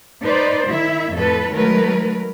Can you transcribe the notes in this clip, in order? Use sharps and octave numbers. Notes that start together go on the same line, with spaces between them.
D#4 B4 C5 D5
D#3 E4 E5
F2 A2 A4 B4
D#3 F#3 G#3 A3 A#4 B4